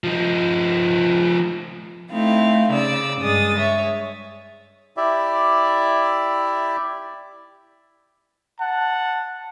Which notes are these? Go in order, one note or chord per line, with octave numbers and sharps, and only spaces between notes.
F3 D#4
A3 C4 D#4 E4 F5
C#3 D5 E6 A6
G2 G#3 D#6 A6
C#5 E5
E4 G4 D5 E5
F#5 A5